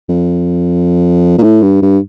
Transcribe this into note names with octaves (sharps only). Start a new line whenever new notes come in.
F2
A#2
A2
G2
G2